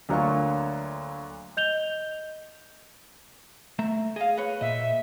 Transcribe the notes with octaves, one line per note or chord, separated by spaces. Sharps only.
D2 F#3 A#3 F4 C#6
D#5 G6 F7 G7
A3 E5 A#5
G#4 D#5 F5
B4 C#5
A#2 D#5 E5